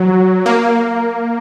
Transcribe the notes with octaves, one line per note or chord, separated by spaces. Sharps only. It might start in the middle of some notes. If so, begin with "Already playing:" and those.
Already playing: F#3
A#3